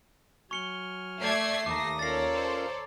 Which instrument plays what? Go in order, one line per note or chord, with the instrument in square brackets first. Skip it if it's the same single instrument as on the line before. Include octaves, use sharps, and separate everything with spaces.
[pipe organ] F#3 G#5 F6 [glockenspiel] C#6 C#7 G7
[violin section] A3 A4 C7 [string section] D5 G#6
[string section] D#2 A#6 [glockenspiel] A#5 D6 [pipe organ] D#6
[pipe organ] C#4 F4 A#4 [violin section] A4 C#5 D5 [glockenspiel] A6 C7
[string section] C5